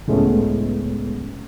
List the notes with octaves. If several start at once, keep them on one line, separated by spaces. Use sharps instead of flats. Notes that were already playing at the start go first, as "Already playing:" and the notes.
C#2 A2 G#3 A3 B3 C#4